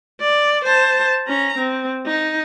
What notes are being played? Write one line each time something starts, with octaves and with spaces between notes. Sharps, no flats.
D5
C5 A5
C#4 A#5
C4
D#4